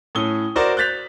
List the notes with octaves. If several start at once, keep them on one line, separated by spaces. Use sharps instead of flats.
A2 C#4 D#6 G7
F#4 A#4 C5 D5
F#6 G6 A6 B6 F7